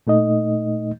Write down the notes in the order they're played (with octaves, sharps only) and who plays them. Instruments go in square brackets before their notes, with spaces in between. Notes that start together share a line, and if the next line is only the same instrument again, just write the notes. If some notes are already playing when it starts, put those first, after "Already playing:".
[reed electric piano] A#2 A3 D#4 D#5